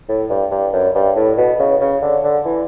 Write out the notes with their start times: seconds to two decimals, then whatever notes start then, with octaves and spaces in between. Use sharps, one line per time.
0.09 A2
0.30 G2
0.51 G2
0.73 F#2
0.95 G2
1.16 A2
1.38 B2
1.59 C#3
1.81 C#3
2.02 D3
2.23 D3
2.45 E3